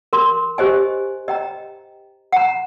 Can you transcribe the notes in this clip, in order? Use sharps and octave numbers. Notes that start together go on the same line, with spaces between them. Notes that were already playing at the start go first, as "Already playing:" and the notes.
A#4 C6
G4 C5 D#5 G#5
D#5 G5 A#5
F#5 A#5